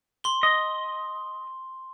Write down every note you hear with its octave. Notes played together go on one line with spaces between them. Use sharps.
C6 G7
D#5